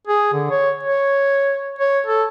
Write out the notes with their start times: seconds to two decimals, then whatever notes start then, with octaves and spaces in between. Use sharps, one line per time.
0.07 G#4
0.33 D3
0.50 C#5
0.83 C#5
1.79 C#5
2.06 A4